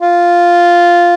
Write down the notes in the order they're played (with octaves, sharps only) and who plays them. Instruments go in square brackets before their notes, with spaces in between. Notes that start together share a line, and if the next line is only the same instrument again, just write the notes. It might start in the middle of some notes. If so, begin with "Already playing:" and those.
[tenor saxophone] F4